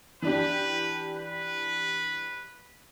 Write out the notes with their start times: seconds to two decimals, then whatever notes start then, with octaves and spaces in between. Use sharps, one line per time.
0.22 E3 D4 G4 B4
1.16 B4